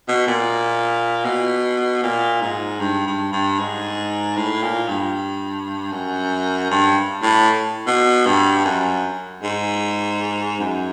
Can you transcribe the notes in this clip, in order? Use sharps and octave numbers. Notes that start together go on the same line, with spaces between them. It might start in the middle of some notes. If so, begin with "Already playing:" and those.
B2
A#2
B2
A#2
G#2
G2
G2
G2
G#2
A2
A#2
G2
F#2
G2
A2
B2
G2
F#2
G#2
F#2